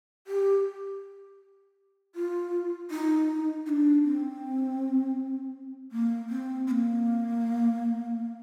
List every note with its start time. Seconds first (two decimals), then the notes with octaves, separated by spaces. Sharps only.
0.27 G4
2.15 F4
2.91 D#4
3.66 D#4
3.69 D4
4.03 C4
5.92 A#3
6.29 C4
6.67 C4
6.71 A#3